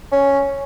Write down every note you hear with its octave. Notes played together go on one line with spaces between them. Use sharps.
C#4